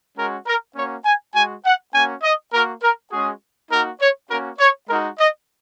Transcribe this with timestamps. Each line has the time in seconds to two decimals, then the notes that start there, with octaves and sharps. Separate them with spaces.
0.17 G#3 C#4 F#4 A#4
0.46 A#4
0.76 A#3 C#4 F#4 C#5
1.05 G#5
1.34 G#3 F#4 G#5
1.64 F#5
1.93 A#3 C#4 F#4 G#5
2.23 D#5
2.53 A#3 F#4 A#4
2.82 A#4
3.11 G#3 C#4 F#4 G#4
3.70 A#3 D#4 F#4 A#4
4.00 C#5
4.29 A#3 C#4 F#4 A#4
4.58 C#5
4.88 G#3 D#4 F#4 A#4
5.18 D#5